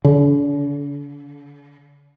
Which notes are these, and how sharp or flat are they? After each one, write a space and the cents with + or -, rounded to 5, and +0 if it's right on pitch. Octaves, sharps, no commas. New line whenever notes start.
D3 -45